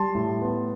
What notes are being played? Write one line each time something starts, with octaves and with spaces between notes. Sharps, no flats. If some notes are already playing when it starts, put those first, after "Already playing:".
Already playing: G3 A5 C6
A2
B3